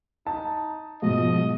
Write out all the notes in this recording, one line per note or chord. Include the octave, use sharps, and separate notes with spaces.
D#4 A5
G#2 B2 F3 D#5